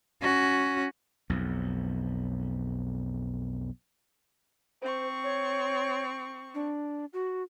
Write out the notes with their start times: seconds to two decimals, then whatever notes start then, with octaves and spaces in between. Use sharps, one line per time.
0.21 C#4 F#4
1.30 B1 F2
4.82 C4 C5 C#6
5.24 C#5
6.54 D4
7.13 F#4